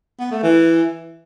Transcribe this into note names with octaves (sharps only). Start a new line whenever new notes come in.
B3
A3
E3